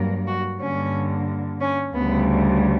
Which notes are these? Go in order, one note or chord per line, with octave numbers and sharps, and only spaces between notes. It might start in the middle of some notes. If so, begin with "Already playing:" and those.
Already playing: G2 F#3 A#3
F#4
G2 D3 A#3 C#4
C#4
D2 C#3 G3 B3